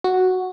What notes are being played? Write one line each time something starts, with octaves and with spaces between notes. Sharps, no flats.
F#4